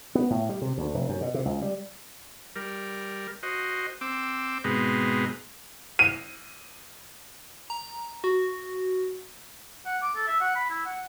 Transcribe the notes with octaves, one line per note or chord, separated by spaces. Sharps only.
B3
A2
G3
C3
D2
F1
F#2
B2
C3
C#2
G3
G3 A#4
F#4 C5 D#5
C4 D6 E6
G#2 B2 G#3 B3 C4 A#5
D#7
A#5
F#4
F#5
D6
A4
E5
F#5
B5
E4
F#5